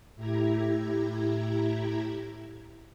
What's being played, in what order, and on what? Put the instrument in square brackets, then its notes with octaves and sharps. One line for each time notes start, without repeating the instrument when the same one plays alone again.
[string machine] A2 E4 G4 A#5 G#6